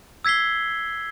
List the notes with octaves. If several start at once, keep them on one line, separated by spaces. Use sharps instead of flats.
E6 G#6 B6 C7 G7